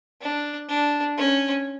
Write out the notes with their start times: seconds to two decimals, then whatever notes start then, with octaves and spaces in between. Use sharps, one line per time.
0.22 D4
0.69 D4
1.17 C#4